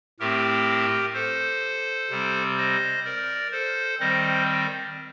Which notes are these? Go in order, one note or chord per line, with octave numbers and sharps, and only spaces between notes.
A2 A3 C4 G4 A#4
A4 C5
C3 G3 C4
C5 D#5
A#4 D5
A4 C5
D#3 G3 C4 C5 D#5